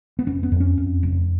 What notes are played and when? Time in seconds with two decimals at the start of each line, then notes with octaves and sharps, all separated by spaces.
0.19 B3
0.27 F1 C#4
0.43 B3
0.52 F2
0.60 C#4
0.77 F2
1.03 F1